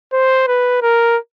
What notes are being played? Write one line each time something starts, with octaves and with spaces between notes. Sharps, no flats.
C5
B4
A#4